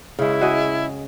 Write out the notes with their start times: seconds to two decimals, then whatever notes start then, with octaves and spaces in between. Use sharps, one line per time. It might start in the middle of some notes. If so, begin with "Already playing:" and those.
0.19 C#3 G#3 E4
0.41 F#4 G#4 D#5